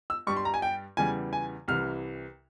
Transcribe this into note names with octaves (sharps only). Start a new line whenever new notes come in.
E6
G2 G3 C#6
C6
A#5
G#5
G5
E2 C#3 E3 G3 G#5
G#5
C2 C3 E3 F6